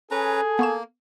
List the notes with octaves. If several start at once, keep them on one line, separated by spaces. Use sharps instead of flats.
C#4 G#4 A4 B4 A#5
A#3 B3 C#6 E7